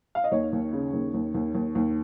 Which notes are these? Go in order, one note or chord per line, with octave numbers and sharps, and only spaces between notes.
F5
D#5
D#2 C#5
D#2
C#3
D#2
D#2
D#2
D#2
D#2